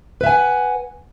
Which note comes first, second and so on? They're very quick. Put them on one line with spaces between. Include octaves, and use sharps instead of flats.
B4 E5 G#5 F#5